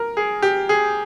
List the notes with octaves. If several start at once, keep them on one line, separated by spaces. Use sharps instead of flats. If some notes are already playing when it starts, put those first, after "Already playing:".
Already playing: A#4
G#4
G4
G#4